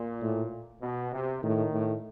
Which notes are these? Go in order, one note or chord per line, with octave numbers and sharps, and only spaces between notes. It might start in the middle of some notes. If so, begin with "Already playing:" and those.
Already playing: A#2
A2
B2
C3
A2 D#3
A2